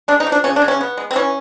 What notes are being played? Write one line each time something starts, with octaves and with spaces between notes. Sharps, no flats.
G#3 D4
D#4
F3
D4
C#3 C#4
D4
C#3
C#4
B3
G#3
C4
E3 C#4